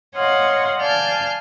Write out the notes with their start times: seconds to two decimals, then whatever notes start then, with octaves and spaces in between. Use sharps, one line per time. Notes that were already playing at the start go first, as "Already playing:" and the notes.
0.16 C#5 D#5 F5 F#5 C6
0.80 D5 F5 G#5 A5 F6 G6